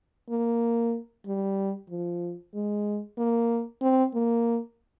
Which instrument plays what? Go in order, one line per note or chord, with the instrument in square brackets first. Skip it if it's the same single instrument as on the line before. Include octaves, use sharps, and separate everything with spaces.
[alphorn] A#3
G3
F3
G#3
A#3
C4
A#3